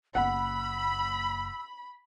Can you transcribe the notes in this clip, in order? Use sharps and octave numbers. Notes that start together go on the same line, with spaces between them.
F#1 A#3 F#5 B5 E6